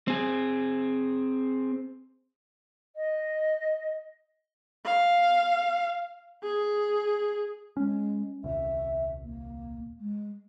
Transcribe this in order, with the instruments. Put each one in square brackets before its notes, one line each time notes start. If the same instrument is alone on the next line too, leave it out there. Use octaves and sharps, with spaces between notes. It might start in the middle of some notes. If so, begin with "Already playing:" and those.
[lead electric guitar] C4 G#4
[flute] D#5
[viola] F5
G#4
[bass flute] G#3 [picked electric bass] C#4
[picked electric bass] D#1 C2 [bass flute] E5
[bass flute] A#3
G#3